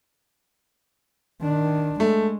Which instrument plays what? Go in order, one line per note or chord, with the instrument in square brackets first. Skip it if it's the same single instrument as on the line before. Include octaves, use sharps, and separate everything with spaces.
[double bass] D#3 D4
[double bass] G#3 [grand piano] A3